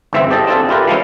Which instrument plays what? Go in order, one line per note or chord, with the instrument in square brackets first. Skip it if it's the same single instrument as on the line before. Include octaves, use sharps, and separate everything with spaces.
[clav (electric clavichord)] G1 G#2 E3 C4 E5
G4 A4 D5 D#5
C4 D4 F4 G#4 A4
E4 F4 G4 A#4 B4
E3 F3 G#3 C#4